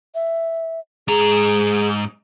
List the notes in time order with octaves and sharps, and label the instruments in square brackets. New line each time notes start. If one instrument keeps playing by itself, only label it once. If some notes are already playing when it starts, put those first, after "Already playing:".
[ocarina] E5
[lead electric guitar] G#2 A#5 [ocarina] G#4